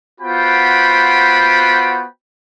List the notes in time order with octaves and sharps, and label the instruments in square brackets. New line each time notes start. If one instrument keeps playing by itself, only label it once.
[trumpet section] B3 F4 F#4 C5 G5 B5